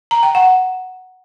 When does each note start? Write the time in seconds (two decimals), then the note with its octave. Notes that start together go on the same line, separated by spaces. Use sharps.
0.11 A#5
0.23 G5
0.35 F#5